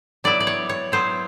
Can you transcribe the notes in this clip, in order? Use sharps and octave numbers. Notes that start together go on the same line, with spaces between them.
F#3 B3 E4 D5
D5
C#5
C#5
F#3 B3 E4 C5